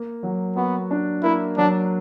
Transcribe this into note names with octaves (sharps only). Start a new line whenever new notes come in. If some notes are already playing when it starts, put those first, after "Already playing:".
Already playing: A#3
F#3
B3 F#4
D4
A#3 E4
F#3 D4